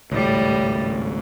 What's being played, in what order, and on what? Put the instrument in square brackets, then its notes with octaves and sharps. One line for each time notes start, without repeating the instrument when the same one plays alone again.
[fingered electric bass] G#1 C#2 [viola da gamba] A2 G3